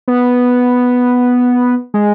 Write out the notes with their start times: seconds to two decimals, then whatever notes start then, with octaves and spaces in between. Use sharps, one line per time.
0.08 B3
1.94 G#3